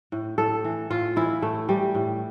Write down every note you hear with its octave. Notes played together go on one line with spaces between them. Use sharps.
A2
A2 A4
E3
A2 F4
E3 E4
A2 A3
E3 G3
A2